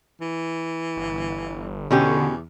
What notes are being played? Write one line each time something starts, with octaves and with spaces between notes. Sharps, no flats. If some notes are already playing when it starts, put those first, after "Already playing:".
E3
G1
E2 B2 D3 C#4 G4